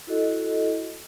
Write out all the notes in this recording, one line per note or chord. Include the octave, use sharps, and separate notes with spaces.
E4 F#4 A4 D#5